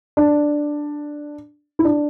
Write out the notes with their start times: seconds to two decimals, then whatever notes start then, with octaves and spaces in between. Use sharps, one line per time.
0.17 D4
1.79 E4
1.85 D4